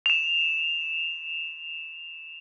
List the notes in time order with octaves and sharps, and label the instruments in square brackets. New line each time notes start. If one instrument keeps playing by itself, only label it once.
[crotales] E7 F7